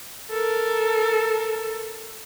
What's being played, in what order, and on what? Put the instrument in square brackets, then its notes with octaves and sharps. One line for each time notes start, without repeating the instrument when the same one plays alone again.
[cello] A4 A#4